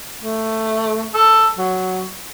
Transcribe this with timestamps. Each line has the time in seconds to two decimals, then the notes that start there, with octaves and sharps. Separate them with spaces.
0.20 A3
1.14 A4
1.57 F#3